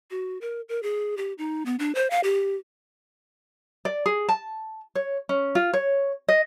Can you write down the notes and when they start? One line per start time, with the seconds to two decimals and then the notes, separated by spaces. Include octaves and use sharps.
0.11 F#4
0.41 A#4
0.69 A#4
0.83 G#4
1.17 G4
1.38 D#4
1.66 B3
1.79 D4
1.95 C5
2.10 F5
2.24 G4
3.85 D5
4.06 G#4
4.29 A5
4.95 C#5
5.29 C#4
5.55 F4
5.73 C#5
6.28 D#5